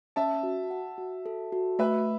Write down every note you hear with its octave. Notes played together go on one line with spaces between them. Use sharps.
C#4 E5 A5
F#4
F#5
F#4
A4
F#4
A3 B4 E5